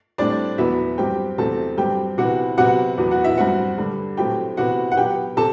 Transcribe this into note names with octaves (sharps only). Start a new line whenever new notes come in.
A2 G3 C4 D4 D5
E2 B2 F#3 B3 E4 E5
G2 F#3 C4 G4 G5
E2 C3 F#3 A3 C4 A4 A5
G2 F#3 C4 G4 G5
C3 E3 B3 F#4 F#5
C3 F#3 B3 F#4 F#5
E2 B2 F#3 B3
F#4 F#5
E4 E5
G2 F#3 C4 F#4 F#5
G2 D3 G3
A2 F#3 A3 C4 G4 G5
C3 E3 B3 F#4 F#5
F#5
B2 F#3 B3 G4 G5
C3 A4 A5